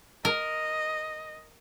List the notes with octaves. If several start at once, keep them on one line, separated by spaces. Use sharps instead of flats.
A#4 D#5